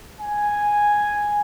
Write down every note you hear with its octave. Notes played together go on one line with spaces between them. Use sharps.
G#5